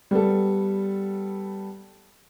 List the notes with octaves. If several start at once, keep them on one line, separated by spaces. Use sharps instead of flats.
G3 B3 A4